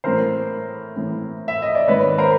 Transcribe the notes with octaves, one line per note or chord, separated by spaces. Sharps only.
A2 E3 A#4 C5
A2 E3
E5
D#5
D5
G#2 D#3 B4 C#5
A#4 C5